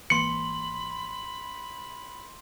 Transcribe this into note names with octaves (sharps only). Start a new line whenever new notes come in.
G#1 E3 A#3 B5 C6 C#7 F#7